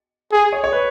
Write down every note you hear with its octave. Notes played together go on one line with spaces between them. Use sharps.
G#4
C#5
C#5
B4